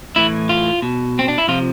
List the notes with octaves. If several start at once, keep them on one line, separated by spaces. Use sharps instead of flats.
A2 E3 E4
F4
B2
C4
D4
E4
C3 F3 F4